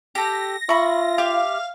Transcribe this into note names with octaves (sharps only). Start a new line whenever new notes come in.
G4 A4 A#6
F4 E5 B5 C#6
G4 F5